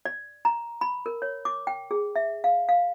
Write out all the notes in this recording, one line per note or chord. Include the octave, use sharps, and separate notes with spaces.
D5
A#5
B5
A#4
C#5
D6
G5
G#4
E5
F5
F5